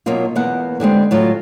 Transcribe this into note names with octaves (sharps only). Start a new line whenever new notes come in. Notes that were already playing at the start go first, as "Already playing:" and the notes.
B2 F#3 A#3 D#4 F4
E2 A#3 B3 A#4 F#5
D3 G3 G#3 C4
A2 F#3 F4